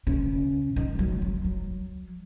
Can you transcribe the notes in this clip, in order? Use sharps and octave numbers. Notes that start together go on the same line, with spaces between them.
C#3
D#3
F#3
F#3
F#3